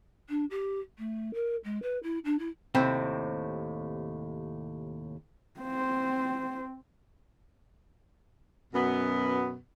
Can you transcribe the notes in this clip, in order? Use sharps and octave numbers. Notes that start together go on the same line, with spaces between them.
D4
G4
A3
A#4
G#3
B4
E4
D4
E4
D#2 A2 C3 C4
C4 C5
F#2 B2 B3